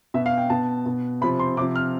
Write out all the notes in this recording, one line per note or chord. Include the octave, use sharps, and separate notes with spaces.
B2 E5
F5
G5
B2 A5
B2
C3 F3 B5
C6
C3 F3 D6
F6